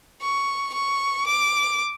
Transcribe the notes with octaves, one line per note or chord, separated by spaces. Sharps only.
C#6
C#6
D6